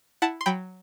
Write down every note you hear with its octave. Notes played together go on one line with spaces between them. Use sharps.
E4 F#5 A5
C6
F#3 G5 B5